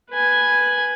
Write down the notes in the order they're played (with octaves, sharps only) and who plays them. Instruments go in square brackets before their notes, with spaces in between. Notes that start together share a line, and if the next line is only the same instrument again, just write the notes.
[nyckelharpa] B4 G#5